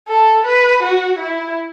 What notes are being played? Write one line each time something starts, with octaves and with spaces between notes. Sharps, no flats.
A4
B4
F#4
E4